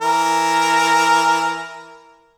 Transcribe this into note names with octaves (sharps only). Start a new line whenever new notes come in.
E3 A#4